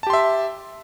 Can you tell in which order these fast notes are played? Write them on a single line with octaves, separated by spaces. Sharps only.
A5 G4 C6 E5